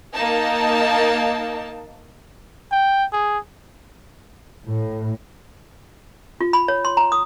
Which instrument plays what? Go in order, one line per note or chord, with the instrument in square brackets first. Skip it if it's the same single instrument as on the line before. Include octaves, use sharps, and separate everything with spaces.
[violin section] A#3 D#4 A5
[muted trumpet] G5
G#4
[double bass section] A2
[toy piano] F4
B5
C#5
C6
A#5
D#6